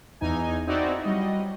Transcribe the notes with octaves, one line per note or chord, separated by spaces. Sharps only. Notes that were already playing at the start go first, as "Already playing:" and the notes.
E2 E3 D#4 G#5
C4 D#4 E4 F#4 D5
F#3 G3 D#5